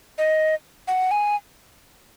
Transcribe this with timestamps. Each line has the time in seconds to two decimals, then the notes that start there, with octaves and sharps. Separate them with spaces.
0.18 D#5
0.88 F#5
1.11 G#5